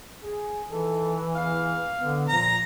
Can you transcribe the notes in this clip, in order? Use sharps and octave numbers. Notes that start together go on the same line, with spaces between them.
G#4
D#3 E3 A4
E2 F5
D3 B3
A#2 F3 A#5